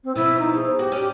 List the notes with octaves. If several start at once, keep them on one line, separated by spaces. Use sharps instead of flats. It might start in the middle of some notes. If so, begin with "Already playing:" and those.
C4
B2 F3 B3 E4
D#4
G#4
F#4 G4
C#4 D5